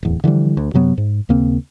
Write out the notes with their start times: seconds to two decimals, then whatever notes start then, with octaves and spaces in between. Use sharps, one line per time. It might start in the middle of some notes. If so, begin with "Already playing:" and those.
0.03 D1 E2
0.24 D3 E3 F3 G3
0.57 D2
0.74 F#2 C3 F#3 B3
0.98 G#2
1.29 D#2 C#3 A#3 C4